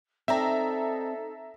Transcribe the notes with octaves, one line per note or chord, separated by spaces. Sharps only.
C4 D#4 A4 C5 D5 E5 A#5